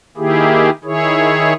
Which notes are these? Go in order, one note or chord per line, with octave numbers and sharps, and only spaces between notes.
D#3 A#3 E4 G4 G#4
D#3 E4 G#4 C#5